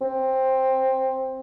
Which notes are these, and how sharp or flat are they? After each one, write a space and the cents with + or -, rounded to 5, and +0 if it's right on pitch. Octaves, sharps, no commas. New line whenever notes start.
C4 +10